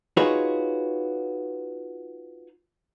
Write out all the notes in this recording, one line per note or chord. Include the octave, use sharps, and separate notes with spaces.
D#4 F4 F#4 G#4 B4 C#5